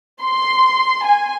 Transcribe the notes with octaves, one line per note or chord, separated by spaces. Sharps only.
C6
G#5